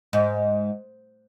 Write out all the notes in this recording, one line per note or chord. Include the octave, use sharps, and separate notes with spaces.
G#2